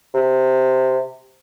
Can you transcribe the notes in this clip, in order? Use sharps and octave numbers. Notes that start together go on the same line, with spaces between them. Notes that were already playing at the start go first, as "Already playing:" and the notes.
C3